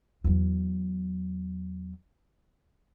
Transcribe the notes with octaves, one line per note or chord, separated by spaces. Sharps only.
E2 F#3